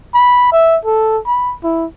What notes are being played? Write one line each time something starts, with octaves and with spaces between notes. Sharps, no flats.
B5
E5
A4
B5
E4